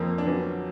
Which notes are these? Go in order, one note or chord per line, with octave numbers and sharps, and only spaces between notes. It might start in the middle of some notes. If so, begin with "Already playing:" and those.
Already playing: F2 A#3 C4
D4
D3 F#3 B3 C#4